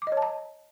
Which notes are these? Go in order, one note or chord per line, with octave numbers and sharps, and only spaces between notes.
D6
D#5
C#5
A5
A#5